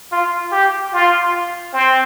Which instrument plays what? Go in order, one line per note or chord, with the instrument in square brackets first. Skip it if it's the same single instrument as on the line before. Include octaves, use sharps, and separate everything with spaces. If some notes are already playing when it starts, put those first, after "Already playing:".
[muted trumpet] F4
G4
F4
C4